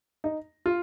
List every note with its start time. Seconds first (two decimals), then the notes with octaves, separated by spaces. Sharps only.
0.24 D#4
0.66 F4